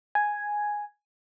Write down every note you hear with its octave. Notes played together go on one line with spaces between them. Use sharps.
G#5